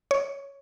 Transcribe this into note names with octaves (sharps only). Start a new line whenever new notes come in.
C#5